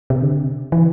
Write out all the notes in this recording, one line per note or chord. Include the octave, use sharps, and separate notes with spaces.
C3
D3
E3